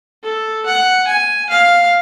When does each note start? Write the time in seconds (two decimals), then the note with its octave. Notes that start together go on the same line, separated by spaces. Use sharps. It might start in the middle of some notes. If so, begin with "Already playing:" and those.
0.24 A4
0.66 F#5
1.07 G#5
1.50 F5